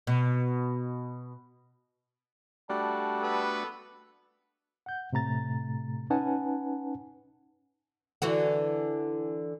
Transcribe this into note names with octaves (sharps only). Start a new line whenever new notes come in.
B2
G3 A3 D4 F#4 A5
B3 A4 B4
F#5 G6
A2 C3 A3 A#5 A6
C#4 D#4 B4 F#5 G#5 A5
D3 E3 F#4